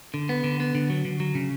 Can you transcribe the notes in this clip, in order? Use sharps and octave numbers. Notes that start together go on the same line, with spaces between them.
D3
B3
D3
B3
D3
F#3
D3
F#3
C#3